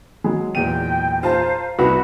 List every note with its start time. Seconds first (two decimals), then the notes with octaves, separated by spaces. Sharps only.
0.24 F#3 G#3
0.55 E2 A#2 G5 D#7
1.23 F4 C5 A5 A#5
1.79 C2 F#4 B4 B5